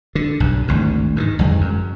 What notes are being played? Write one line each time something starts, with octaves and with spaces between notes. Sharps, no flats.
D3
B1 G2
G#1 D2 G2
G#2 D3 D#3
G1 F2 G#3
F#2